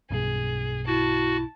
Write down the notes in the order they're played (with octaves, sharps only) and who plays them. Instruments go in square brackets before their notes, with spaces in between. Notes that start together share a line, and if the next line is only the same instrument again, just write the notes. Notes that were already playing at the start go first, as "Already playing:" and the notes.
[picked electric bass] B1 G2 B2 [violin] G#4
[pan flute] E4 [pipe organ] F#4 [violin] A5